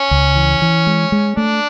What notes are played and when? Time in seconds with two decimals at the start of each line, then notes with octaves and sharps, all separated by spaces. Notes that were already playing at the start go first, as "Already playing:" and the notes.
Already playing: C#4
0.11 C#2
0.36 E3
0.62 E3
0.87 G#3
1.12 G#3
1.37 A3 D4